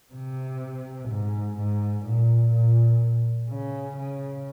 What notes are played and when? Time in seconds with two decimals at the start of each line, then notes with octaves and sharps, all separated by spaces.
0.14 C3
1.09 G#2
1.58 G#2
2.05 A#2
2.53 A#2
3.49 C#3
3.97 C#3